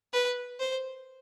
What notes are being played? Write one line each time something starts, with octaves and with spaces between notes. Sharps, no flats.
B4
C5